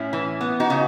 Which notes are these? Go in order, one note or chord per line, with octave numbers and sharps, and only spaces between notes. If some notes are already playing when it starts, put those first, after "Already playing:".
Already playing: A2 C#4 E4
E3
B3
D#4 F#4
C#3